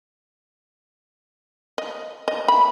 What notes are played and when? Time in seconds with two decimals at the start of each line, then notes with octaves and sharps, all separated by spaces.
1.78 D#5
2.28 D#5
2.48 B5